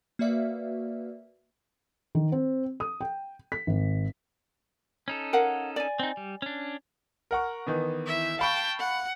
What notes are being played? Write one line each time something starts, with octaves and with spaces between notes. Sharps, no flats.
A#3 F#4 B4 D5 E5 F5
D#3
C4
D#6
G5
B6
G#1
C#4 D#4 A4
A#4 F5 F#5
D5 G#5
C4 D#4
G3
C#4 D4
A#4 F#5 C#6
D#3 E3 B3
E4 E5
F5 G5 A5 B5 C#6
F#5